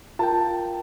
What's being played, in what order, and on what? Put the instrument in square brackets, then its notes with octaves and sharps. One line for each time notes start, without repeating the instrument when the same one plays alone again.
[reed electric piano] F4 A#4 G5 [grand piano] A5